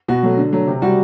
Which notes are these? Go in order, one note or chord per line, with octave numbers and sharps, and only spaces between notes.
B2 F#4
F#3 A3
D3
F#3 A3
C3
G3 F#4